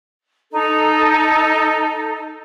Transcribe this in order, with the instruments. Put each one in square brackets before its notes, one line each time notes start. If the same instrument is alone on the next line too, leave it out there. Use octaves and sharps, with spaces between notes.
[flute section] D#4 A4